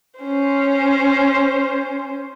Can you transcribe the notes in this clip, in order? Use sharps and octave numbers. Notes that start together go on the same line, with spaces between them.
C#4 C5